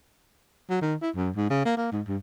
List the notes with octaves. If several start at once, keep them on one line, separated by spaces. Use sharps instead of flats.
F#3
D#3
E4
F#2
G#2
C#3
A#3
A#3
G#2
G2